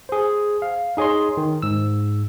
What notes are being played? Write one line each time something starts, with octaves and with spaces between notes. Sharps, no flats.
G#4 C5
F5
D#4 G#4 C#5 D#5 C6
D#3
G#2 E6